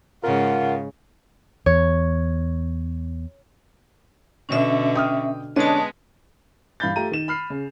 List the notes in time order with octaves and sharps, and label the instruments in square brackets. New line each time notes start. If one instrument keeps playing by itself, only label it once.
[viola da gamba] G#2 C#3 [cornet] F4 [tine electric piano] A#4 [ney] F#5
[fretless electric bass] E2 [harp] C#5
[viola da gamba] B2 D3 [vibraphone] C#4 E5
[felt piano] G5 D#6 F6
[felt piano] D3 C#4 D4 [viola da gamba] G#3 B3 [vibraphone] D#5 A5
[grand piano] G2 E3 F5 B5 G6 A6
A3 F4 G4 A#5 D#7
D#3 E7
B5 F6 C7
C#3